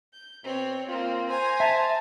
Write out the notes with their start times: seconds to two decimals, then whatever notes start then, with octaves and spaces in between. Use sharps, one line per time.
0.13 G6
0.44 B2 C4 C#5
0.89 A#3 C4 F4
1.30 C5 G#5 A#5
1.60 E5 A5